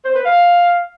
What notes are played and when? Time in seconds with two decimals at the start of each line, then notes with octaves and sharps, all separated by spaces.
0.05 C5
0.15 B4
0.25 F5